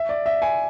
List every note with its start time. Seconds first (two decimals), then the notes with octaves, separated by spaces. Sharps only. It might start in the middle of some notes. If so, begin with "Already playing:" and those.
Already playing: E5
0.09 D5
0.26 E5
0.42 G#5